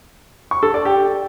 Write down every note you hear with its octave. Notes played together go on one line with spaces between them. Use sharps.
C#6
A4
D5
G4